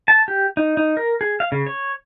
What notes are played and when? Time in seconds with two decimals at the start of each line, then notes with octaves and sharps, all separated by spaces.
0.08 A5
0.28 G4
0.57 D#4
0.77 D#4
0.97 A#4
1.21 G#4
1.40 F5
1.52 C#3
1.66 C#5